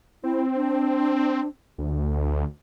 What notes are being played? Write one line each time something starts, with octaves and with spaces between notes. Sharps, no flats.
C4 E4
D4
D2
D3